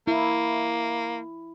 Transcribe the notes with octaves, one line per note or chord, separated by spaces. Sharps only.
A#3 E4